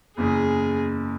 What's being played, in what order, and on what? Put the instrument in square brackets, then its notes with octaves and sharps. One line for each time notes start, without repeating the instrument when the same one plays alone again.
[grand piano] F#1 E2 C#3 [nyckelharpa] G#4